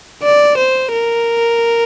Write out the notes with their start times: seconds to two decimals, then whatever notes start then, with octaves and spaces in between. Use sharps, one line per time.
0.23 D5
0.57 C5
0.93 A#4